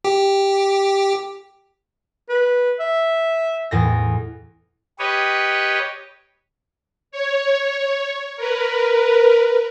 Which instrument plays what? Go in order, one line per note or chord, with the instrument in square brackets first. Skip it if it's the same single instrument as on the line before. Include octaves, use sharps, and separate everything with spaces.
[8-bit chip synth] G4
[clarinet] B4
E5
[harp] E2 A2 A#6
[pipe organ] G4 B4 C#5 D#5
[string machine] C#5
A#4 B4